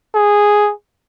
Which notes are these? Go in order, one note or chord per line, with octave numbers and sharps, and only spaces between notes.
G#4